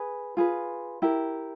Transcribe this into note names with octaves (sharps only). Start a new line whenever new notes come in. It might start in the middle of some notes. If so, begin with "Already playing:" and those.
Already playing: G#4 B4
F4 G#4 B4
E4 G4 A#4